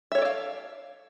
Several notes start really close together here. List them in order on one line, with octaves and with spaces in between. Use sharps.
E5 C#5 A4 D5 F5